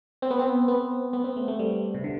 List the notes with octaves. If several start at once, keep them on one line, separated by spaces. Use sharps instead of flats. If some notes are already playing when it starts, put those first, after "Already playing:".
C4
B3
C4
B3
B3
C4
A3
A3
G3
C3
D3